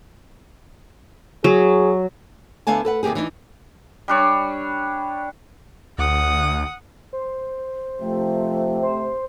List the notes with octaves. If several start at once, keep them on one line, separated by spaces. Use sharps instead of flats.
F#3 G#4
D2 D3 B3 F5 G#5 A5
A4 B4 F#5
D#2 C3 A#3 G4 G#4
E3 D4 D#4
G3 D4 C#5
D2 F#5 D#6
C5
C3 F3 A3
C5